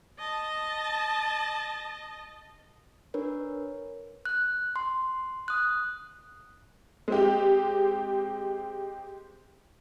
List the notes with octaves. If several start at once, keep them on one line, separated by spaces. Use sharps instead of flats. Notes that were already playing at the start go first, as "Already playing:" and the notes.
D#5 A5
D4 A#4 B4 C#5
F#6
C6
D#6 F#6
G#3 C4 G4